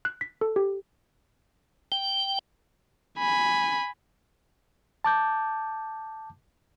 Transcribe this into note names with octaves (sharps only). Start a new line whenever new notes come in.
F#6
B6
A4
G4
G5
G#5 B5
A5 D6 G6